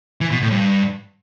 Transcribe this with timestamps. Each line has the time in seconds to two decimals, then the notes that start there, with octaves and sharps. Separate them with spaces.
0.21 E3
0.32 B2
0.42 A2
0.52 G2